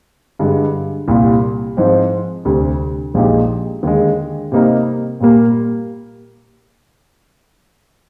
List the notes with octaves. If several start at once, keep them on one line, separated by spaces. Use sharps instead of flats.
G2 D3 G#3
C2 A#2 G3
G#2 F3 G#3 C4
D2 C3 G3
A#1 A#2 G#3 D#4 G4
D#2 D3 G#3
C3 G3 A#3 D#4 A#4
A#2 G3 A#3